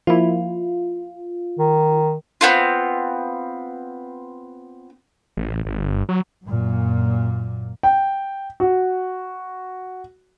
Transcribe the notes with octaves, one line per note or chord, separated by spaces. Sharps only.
F3 A#3 E4 F4
D#3
B3 C4 F4
A1
G#1
G1
F#3
F#2 A#2
G5
F#4